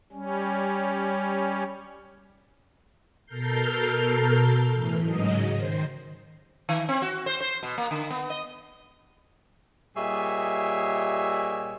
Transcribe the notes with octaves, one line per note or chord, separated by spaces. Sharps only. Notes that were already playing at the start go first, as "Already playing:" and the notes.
G3 C#4
B2 A4 A#4 F6 G6 C7
A2 E3
G#2 C#3 F#3 G#3 D#5
D#3 C5
D#3
C4
F#4
C5
C5
B2
A#3
D3
B3
D#5
A#2 G3 G#4 C#5 D#5 E5